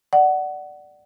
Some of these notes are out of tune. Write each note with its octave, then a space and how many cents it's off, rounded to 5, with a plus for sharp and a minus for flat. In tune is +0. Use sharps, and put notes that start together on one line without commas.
D5 +10 F#5 +15